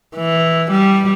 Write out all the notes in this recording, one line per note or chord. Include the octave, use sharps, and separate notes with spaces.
E3
G3